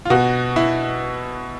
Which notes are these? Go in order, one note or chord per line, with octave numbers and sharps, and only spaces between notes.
F4
B2 F#4
E4